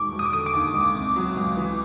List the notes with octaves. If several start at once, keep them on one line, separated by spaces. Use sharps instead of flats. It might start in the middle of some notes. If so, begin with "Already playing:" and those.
Already playing: E1 D#3 C#6 D6
E1
D#6
D6
D3 D#6
D6
D#2
C#2
C3
F#3
C#2
E3